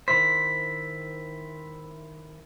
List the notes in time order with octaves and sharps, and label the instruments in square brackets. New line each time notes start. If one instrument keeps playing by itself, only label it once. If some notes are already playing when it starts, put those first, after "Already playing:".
[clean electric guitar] D#3 E4 C5 [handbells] B6